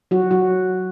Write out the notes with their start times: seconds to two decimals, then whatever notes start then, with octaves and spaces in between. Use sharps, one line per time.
0.11 F#3 F#4
0.31 F#3 F#4